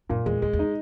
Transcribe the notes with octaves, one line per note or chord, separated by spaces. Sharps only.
F#2 A#2
E2 G#3
E2 G#3
E2
D#4